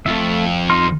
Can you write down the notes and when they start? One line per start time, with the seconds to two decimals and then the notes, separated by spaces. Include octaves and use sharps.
0.06 F2 A3 F4 E5
0.70 D#4 C6 F6